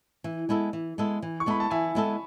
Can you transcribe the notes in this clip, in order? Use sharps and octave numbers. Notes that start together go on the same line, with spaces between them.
E3
G#3 B3 E4 A4
E3
G#3 B3 E4 A4
E3
C#6
G#3 B3 E4 A4 B5
A5
E3 E5 G#5
G#3 B3 E4 A4